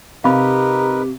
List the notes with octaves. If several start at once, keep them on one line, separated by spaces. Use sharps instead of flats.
C3 D#4 G4 A#4 B4 F5 B5